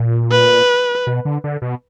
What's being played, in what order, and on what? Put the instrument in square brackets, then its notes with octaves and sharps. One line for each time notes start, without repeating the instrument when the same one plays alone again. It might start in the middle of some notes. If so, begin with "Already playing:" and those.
Already playing: [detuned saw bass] A#2
[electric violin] B4
[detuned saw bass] B2
D3
D3
B2